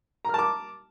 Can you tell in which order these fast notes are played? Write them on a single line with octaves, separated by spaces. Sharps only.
A#5 F6 A5 D6